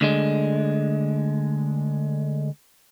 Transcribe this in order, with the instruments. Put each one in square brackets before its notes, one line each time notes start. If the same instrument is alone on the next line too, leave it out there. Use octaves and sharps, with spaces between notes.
[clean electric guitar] D2 D3 G#3